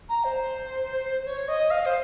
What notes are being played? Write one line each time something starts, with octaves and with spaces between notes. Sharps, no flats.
A#5
C5
C#5
D#5
F5
C5